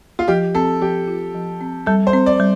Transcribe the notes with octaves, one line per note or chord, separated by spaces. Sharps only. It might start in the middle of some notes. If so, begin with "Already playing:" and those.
F4
F3 G4
C4 A4
F3 G4
F4
F3
C4
G3 A4
C5
C4
D5
G3